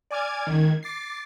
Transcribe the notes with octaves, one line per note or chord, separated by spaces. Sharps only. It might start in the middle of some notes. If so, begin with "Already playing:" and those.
D5 G#5 D6 F6 G#6
C#2 D#3 G#6
D6 A6 C7